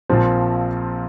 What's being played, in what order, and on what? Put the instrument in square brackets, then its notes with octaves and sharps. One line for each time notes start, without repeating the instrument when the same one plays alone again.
[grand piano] A#1 A#2 F3 C4